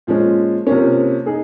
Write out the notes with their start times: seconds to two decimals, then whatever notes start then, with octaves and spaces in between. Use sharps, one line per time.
0.07 A#2 F3 G#3 C#4
0.67 C3 F3 A#3 C#4
1.26 D#4 G#4